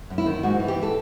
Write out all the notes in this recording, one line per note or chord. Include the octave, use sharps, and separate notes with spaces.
F#2
E4
D#3
G#2 F#4
E3
G4
A4